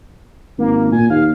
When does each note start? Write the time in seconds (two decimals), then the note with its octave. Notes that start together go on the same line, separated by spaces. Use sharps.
0.58 G#1 A#3
0.92 A#2 G#5
1.10 D#2 F5